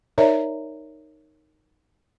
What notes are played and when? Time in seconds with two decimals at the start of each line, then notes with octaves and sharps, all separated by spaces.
0.18 D#4 A#4 C#5 D5 E5 A#5